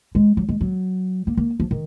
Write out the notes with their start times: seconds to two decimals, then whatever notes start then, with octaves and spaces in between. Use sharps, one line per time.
0.15 G#3
0.37 F#3
0.49 G#3
0.61 F#3
1.27 A#3
1.37 A#3
1.60 F3
1.71 D#3